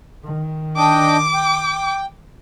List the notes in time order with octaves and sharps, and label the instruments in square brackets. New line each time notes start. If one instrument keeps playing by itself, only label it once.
[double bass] D#3
[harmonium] D4 D#5 G5 [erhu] D6
[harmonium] G5